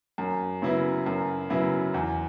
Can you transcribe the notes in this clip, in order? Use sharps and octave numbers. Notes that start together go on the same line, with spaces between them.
F#2
C#3 F#3 B3 E4
F#2
C#3 F#3 B3 E4
E2